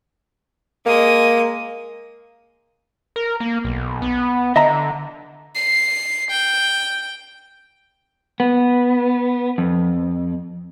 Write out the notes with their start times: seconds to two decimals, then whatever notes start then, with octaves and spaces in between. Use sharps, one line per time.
0.86 G#3 A#3 D#6
3.16 A#4
3.40 A#3
3.65 B1
4.02 B3
4.56 D3 D#5 E5 A#5
5.55 C7
6.31 G5
8.40 B3
9.58 F2